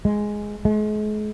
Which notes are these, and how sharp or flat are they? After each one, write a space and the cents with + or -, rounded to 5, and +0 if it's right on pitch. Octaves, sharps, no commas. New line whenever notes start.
G#3 +5
G#3 +40